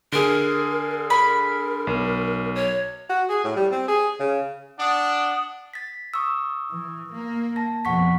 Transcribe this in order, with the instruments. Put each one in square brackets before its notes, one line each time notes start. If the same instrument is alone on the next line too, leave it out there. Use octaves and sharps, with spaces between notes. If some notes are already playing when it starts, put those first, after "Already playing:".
[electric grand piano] D3 G#4 [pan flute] A#4
[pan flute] A#4 [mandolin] B5
[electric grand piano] B1
[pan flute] C#5
[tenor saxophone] F#4
G#4
A2
G3
C4
G#4
C#3
[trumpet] D4 [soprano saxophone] F#5 [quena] D#6
[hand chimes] A6 B6
C#6 D#6 E6
[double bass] E3
A#3
[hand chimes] A5 A#6
[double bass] F2 B2 [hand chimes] F#5 C#6 B6